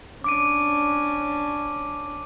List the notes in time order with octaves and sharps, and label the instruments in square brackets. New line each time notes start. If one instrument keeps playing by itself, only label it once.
[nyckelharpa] C#4 D4 [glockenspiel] D6 D7 D#7